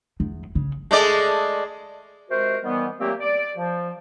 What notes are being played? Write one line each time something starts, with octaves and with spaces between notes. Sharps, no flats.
E2
C#3
G#3 A3 D5
C3 G#3 F#4 A#4 C5
D#3 E3 G3 B3
A#2 F#3 A3 A#3 C4 G4
D5
F3